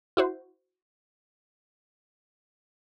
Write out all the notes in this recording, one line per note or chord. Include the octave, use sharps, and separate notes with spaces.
E4 F#4 C5